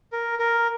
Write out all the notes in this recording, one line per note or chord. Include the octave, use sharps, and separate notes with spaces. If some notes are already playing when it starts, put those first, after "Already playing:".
A#4
A#4